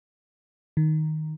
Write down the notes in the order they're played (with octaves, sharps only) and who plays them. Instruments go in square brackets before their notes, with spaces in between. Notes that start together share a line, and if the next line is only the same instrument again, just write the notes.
[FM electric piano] D#3